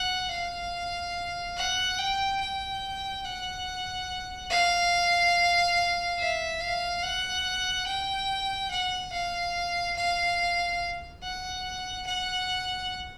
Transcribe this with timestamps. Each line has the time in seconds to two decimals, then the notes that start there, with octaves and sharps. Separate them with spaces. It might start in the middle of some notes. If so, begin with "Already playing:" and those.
Already playing: F#5
0.31 F5
1.57 F#5
1.98 G5
2.40 G5
3.24 F#5
4.50 F5
6.19 E5
6.61 F5
7.03 F#5
7.87 G5
8.71 F#5
9.12 F5
9.97 F5
11.23 F#5
12.07 F#5